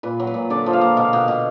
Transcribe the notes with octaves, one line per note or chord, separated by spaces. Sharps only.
A#2 B4
F#3
B4
A#2
D3 D5
F3
F5
A#3
B2 F5
B2
B2